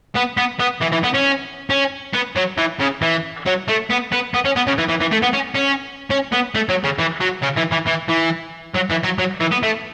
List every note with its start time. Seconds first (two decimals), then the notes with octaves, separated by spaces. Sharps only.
0.15 B3
0.37 B3
0.60 B3
0.82 E3
0.92 E3
1.04 B3
1.15 C#4
1.70 C#4
2.14 B3
2.36 F#3
2.58 E3
2.80 C#3
3.02 E3
3.46 F#3
3.68 A3
3.90 B3
4.12 B3
4.34 B3
4.45 C#4
4.56 B3
4.67 C#3
4.78 E3
4.89 E3
5.00 E3
5.11 A3
5.22 B3
5.33 C#4
5.55 C#4
6.10 C#4
6.32 B3
6.55 A3
6.69 F#3
6.84 C#3
6.99 E3
7.21 F#3
7.43 C#3
7.57 E3
7.72 E3
7.87 E3
8.09 E3
8.75 F#3
8.90 E3
9.04 F#3
9.19 F#3
9.41 E3
9.52 B3
9.63 A3